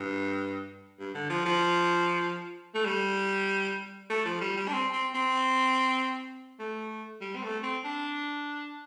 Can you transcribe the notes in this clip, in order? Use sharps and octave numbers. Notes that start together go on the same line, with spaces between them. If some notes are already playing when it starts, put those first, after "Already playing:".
Already playing: G2
G2
D3
F3
F3
A3
G3
A3
F3
G3
G3
D4
C4
C4
C4
A3
G3
C4
A3
C4
D4